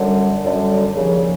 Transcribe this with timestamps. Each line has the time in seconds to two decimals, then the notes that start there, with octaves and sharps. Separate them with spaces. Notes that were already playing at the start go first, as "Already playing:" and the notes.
Already playing: F#2 D3 G3
0.43 F#2 D3 G3
0.95 D#2 C#3 F3